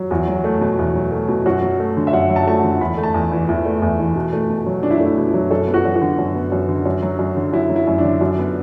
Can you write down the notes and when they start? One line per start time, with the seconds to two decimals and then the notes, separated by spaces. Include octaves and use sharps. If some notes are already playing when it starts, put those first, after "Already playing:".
Already playing: F#3
0.11 E2 F#4
0.28 F#3
0.44 A3
0.61 B2
0.79 E2
0.95 F#3
1.12 A3
1.28 B2
1.46 F#2 F#4
1.62 F#3
1.80 A3
1.97 D3
2.07 E5
2.13 F#2 F#5
2.30 F#3
2.36 A5
2.47 A3 A5
2.58 F#5
2.64 D3
2.80 E2 B5
2.97 A3
3.03 A5
3.14 E2
3.32 E3
3.48 E2 E4
3.65 A3
3.82 E2
3.99 E3
4.16 B2
4.33 A3
4.50 B2
4.66 F#3
4.83 B2 D4
4.90 E4
4.97 D4
5.00 A3
5.05 E4
5.17 B2
5.28 E4
5.34 F#3
5.51 F#2 A4
5.68 B3
5.74 F#4
5.85 F#2
5.96 F#4
6.01 D3
6.18 F#2
6.35 B3
6.52 F#2
6.69 D3
6.85 F#2
7.03 F#3
7.19 F#2
7.37 D3
7.53 F#2 E4
7.70 F#3
7.76 E4
7.87 F#2
7.98 D4
8.04 D3
8.21 F#2
8.38 B3